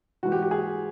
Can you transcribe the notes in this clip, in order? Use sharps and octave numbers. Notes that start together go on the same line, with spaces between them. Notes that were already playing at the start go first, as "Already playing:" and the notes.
G#2 E3 F#4
G4
G4
G#4